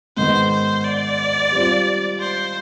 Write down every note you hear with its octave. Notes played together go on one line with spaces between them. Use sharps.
G#2 D#3 B3 C5
C5
D5
G3 C4 F4
C5